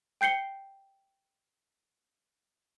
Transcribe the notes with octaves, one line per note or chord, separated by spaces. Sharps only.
G5 G6 C7 C#7 G7